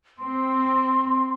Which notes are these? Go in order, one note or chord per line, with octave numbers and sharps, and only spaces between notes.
C4 C6